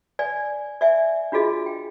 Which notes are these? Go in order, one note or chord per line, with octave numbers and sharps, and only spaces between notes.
D5 G#5
D5 E5 G#5
D4 F4 F#4 G#4 D#5
G5